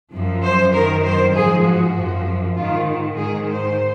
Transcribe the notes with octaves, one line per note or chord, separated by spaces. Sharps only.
F#2 F3
C5
F#2 D#3 A#4
C5
G#2 F3 G#4
F#4
F#2 F3
G#2 D#3 F4
G#2 D#3 G#4
C5